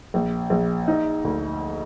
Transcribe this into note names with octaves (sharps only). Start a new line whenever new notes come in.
A#1
A#1
D#4
D2